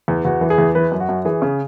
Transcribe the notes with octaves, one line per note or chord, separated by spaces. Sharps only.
E2
E2 F#4
E3
G#4
E2
E3 B4
F#2
F#4
F#2
E3 G#4
C#3